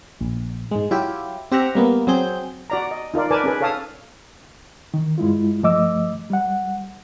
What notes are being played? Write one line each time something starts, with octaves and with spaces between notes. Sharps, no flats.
A#1
G#2 G#3
F#3 E4 F4 G4
C4 G4 E5 F#5 A#5
G3 A#3 B3
F#3 C4 G#4 G6
F#4 D5 A#5
D#5
D#4 F4 A#4 D5
A#4 B4 D5 G#5 A5 D6
C#4 G#4 B4
A4 C#5 F5 A5 D#6
D#3
G2 G#3 E4 F4
G2 F3 A3 D#5 D6 E6
G3 F#5